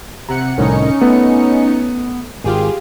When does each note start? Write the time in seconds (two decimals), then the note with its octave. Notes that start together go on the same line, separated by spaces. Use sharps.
0.29 C3 F#5 A#5 C#7
0.58 C2 A2 D#3 C#4 D#4 C#7
1.01 A3 B3
2.44 G#1 F4 G4 G#4